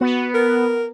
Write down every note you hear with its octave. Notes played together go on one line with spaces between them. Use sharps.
B3 F#4
A#4